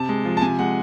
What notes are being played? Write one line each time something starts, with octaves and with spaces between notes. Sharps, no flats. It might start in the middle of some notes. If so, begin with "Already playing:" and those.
Already playing: C3 A5
G#3
F3
A5
C3 G#5
G#3 F#5